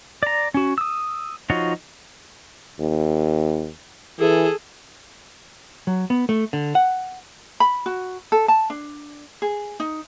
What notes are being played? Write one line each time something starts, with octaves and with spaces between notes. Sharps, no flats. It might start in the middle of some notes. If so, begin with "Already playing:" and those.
D5 A#5
C#4 F#4
D#6 E6
F3 D#4 F4 F#4 C#5
D#2
E3 G#4 A4
F#3
B3
A3
D3
F#5
B5
F#4
A4
A5
D4
G#4
D#4